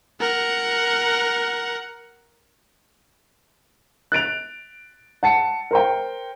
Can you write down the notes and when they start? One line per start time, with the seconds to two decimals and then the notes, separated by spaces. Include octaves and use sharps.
0.21 A#4 F#5
4.12 F#6 A6 D7 F7
5.23 F#5 A5 C#7
5.71 A#4 C5 G5